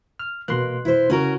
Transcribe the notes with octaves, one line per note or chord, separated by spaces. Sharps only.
F6
B2 A#3 C6 F#6
E4 C5
C#3 C#4 F#4 A#4